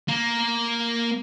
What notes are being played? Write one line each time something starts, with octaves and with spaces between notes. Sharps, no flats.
A#3